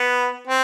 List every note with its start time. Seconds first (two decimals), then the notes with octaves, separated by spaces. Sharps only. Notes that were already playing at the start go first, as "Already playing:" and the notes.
Already playing: B3
0.47 C4